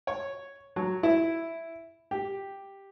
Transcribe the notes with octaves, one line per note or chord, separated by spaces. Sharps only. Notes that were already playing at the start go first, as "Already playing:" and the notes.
C#5
F#3
E4
G4